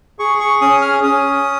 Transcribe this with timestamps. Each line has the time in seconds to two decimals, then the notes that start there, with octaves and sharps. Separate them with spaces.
0.19 G#4 C#6
0.40 C#6
0.61 C#4 D#6
0.82 F6
1.03 C#4 D#6